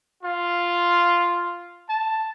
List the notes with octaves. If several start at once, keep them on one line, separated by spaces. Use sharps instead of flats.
F4
A5